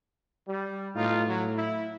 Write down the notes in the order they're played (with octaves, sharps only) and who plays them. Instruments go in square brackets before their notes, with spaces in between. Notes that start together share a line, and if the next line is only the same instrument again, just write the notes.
[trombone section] G3
[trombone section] B1 D#4 F4 [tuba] A2
[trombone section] F#3
E4